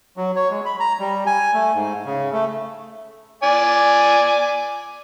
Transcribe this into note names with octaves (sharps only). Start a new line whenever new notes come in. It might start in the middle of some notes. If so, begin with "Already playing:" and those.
F#3
C#5
G#3
B5
A#5
G3
G#5
A3
G#2
C#3
A3
D5 G#5